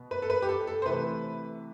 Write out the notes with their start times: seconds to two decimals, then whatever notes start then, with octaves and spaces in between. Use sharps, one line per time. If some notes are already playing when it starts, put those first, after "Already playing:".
Already playing: B2 B3
0.11 B4
0.22 A4
0.30 B4
0.42 G4
0.49 A4
0.67 A4
0.82 C5
0.86 C3 E3 A3 B4